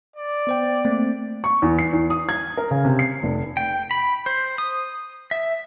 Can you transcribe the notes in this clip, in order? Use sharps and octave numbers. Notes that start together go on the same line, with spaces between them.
D5
B3 C5 G5
A3 A#3 C4
C#6
E2
C7
E2
D#6
G#6
A#4
C#3
C3
C7
F1
G5
B5
C5
D#6
E5